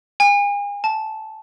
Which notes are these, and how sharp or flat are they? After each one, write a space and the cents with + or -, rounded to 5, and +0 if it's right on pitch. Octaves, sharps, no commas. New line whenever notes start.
G#5 -40
A5 -10